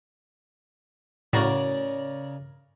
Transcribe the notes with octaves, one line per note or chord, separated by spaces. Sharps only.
A2 C#3 F#4 A#4 D5